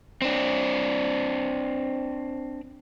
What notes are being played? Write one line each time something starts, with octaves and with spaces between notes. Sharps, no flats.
C4 D4